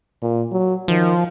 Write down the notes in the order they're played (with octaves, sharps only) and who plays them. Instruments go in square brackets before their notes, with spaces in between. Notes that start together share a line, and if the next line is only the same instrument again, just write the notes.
[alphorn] A#2
F#3
[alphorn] D#3 [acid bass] F3